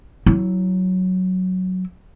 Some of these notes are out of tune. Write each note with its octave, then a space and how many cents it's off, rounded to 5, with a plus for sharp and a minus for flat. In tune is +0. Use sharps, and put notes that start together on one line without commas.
F#3 +0 E4 +0